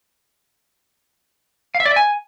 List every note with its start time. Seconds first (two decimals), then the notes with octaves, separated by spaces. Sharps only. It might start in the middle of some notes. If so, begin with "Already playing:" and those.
1.75 F5
1.80 E5
1.85 D5
1.91 E5
1.96 G#5